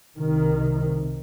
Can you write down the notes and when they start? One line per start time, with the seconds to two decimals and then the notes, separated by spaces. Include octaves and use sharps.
0.17 C2 C3 D#3